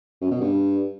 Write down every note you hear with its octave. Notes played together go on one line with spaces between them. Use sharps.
F#2
B2
G2